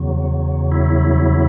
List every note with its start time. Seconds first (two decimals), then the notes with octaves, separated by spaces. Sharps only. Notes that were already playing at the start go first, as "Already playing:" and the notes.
Already playing: E2 C#3 F#3
0.72 E4